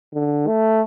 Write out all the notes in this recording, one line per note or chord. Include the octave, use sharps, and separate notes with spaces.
D3
A3